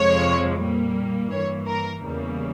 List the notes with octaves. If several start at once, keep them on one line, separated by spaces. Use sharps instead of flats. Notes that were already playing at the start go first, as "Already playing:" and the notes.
Already playing: F2 C3 F3 G#3 C#5
A#2 G3 A#3
G2 E3 A#3 C#5
A#4
E2 C#3 E3 G3 A#3